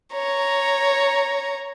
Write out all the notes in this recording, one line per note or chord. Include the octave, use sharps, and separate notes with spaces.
C#5 A#5